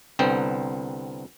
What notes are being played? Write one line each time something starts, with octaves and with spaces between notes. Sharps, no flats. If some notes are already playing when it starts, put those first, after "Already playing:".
C2 D3 B3 C4 G5